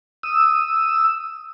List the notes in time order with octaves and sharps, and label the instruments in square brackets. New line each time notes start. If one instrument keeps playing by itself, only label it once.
[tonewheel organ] D#6 E6